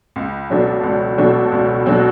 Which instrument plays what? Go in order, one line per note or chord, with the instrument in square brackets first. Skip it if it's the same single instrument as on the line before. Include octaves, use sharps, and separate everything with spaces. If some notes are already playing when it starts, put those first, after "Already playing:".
[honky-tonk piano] C#2
B2 F#3 A3 D4
C#2
B2 F#3 A3 D4
C#2
B2 F#3 A3 D4